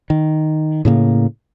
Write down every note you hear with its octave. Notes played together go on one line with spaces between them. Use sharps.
D#3
A2 C#3 A#3